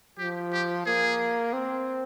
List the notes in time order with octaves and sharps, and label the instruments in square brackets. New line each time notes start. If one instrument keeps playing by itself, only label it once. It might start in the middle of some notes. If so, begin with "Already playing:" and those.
[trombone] F3 [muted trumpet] G4
[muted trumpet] G4
[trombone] A#3 [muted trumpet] G#4
[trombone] C4